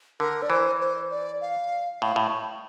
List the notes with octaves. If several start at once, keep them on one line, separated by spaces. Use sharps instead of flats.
D3 A#4
D5
E3 C5
C5
D5
F5
A2 F5
A2